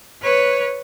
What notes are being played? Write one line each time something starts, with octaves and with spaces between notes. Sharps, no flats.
B4 C#5